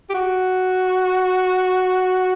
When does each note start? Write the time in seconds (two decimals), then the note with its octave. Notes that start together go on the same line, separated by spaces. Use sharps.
0.10 G4
0.14 F#4